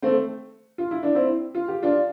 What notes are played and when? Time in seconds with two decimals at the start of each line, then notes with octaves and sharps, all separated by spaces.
0.02 A3 C4
0.78 F4
0.91 E4
1.03 D4
1.15 C4 E4
1.55 F4
1.68 G4
1.83 D4 F4